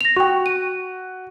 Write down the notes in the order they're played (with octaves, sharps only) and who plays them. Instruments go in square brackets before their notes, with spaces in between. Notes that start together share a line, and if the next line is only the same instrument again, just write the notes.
[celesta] A#6 F7
[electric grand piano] F#4 [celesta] G5 C#6
[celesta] D#7